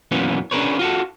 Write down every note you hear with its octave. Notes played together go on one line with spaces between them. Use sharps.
F#2 B2 E3 A#3 B3 C#4
C#4 D4 G#4 A#4 B4 C#5
F4 F#4 A4